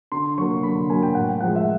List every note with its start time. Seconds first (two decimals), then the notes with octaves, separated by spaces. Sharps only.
0.12 D3 C6
0.38 F#3 A#3 C#6
0.63 D3 B5
0.89 F#3 A#3 G#5
1.03 G5
1.15 A2 F#5
1.41 F3 G#3 F#5
1.56 E5